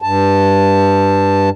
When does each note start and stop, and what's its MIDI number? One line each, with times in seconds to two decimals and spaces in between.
0.02 1.50 43
0.02 1.50 81